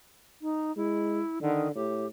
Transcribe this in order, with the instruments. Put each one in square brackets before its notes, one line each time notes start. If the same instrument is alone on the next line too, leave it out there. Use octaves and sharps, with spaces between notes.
[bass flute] D#4
[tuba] G#3 [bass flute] E4
[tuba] D3 [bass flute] D#3
[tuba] A2 [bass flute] G4